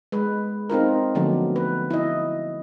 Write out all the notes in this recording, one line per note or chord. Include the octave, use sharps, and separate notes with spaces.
G#3 B4
C4 D#4 F4 A#4
D3 F3 F#3 A3 B3 D4
B4
E4 D#5